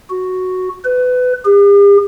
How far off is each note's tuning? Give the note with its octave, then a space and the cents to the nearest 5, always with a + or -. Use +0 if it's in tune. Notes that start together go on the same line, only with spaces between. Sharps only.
F#4 +0
B4 +25
G4 +45